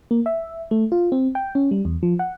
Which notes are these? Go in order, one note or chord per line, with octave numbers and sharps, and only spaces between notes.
A#3
E5
A3
F4
C4
G5
C#4
G3
E2
F3
F#5